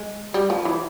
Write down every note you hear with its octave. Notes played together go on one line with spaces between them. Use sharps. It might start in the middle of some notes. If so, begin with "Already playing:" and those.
Already playing: G#3
G3
F3
E3